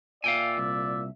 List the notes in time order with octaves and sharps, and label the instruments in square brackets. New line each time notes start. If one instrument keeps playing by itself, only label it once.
[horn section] A#2 D5 E5 [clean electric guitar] F5 G5 G#5
[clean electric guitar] C2